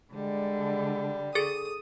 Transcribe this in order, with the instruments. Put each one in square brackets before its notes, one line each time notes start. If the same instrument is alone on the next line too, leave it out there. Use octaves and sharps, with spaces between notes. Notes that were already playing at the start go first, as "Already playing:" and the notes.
[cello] D3 [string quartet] G3 [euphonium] G#3
[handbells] G#4 A4 A6 [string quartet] D#6